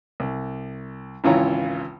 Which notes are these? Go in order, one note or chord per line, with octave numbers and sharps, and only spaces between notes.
C2
G#1 C#2 E3 F4 C#5 A#5